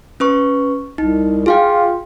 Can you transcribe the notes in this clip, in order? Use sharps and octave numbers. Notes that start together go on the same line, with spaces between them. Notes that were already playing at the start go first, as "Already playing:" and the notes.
C#4 B4 C#6
C2 D#4
F4 G#4 F5 G5